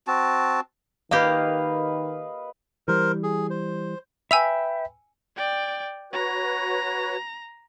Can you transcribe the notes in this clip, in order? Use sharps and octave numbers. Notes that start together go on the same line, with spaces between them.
C4 F#4 A5
D#3 A#3 G4 B4 D#5 F5
E3 G3 A#4 C5
G#4
C5
B4 E5 G5 G#5 B5 E6 F7
D5 G5
F#4 B4 C#5 A#5